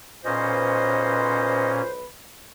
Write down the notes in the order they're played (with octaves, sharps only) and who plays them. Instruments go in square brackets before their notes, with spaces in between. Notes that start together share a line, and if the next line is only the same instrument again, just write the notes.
[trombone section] B1 B4 [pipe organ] A#2 C#4 [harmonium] C5 [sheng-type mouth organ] D#5